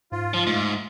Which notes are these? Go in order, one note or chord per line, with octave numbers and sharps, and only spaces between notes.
G#2 F4
F3
G#2 A3